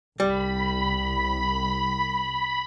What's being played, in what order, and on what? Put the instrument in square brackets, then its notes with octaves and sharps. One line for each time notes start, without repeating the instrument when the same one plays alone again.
[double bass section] C2 [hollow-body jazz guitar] G3 [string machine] B5